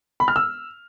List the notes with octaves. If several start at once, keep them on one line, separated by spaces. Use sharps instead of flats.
B5
F6
E6